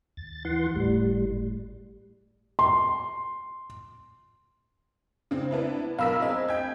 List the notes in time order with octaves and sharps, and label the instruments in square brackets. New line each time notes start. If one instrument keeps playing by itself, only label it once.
[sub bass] D#2 [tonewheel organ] A6
[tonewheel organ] E3 F#5 C6
[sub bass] G1 [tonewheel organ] A2 G3
[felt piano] C6
[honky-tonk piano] C#3 C4
B3 D4 E4
[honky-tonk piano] B1 A#4 B6 [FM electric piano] F5 B5 E6
[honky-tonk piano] C4 G#4 [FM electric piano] D#5
[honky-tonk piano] G5 G#6